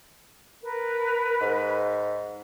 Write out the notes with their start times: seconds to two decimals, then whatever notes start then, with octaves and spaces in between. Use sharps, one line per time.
0.62 A#4 B4
1.41 G#2